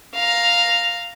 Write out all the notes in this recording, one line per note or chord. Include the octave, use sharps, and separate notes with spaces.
F5 A#5